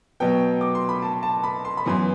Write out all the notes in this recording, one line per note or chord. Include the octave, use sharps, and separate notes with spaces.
B2 F#3 B3 G5
D6
C6
B5
A5
A5
B5
C6
B5
F#2 E3 B3 C6